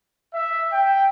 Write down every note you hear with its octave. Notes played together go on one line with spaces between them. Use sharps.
E5
G5